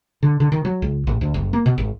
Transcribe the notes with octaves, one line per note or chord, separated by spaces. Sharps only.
D3
D3
D#3
F#3
C#2
A1
D2
F#1
A#3
B2
G#1